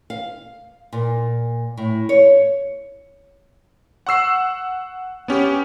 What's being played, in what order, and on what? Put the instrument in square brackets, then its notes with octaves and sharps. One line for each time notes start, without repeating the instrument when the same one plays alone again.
[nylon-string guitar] F5
A#2
A2
C#5
[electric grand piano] F#5 C#6 E6 C7
B3 C#4 G4